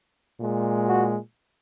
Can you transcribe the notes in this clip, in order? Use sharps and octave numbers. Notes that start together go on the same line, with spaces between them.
A#2 G#3
F#4